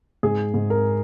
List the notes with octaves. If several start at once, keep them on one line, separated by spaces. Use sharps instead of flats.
G#2 G#4
G#2
A#4